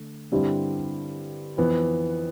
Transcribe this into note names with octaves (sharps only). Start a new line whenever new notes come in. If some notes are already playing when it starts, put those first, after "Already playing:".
Already playing: D3 A3
G2 D3 G3 C4 E4
F2 E3 B3